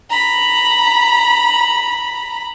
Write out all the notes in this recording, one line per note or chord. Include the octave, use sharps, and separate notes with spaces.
A#5 B5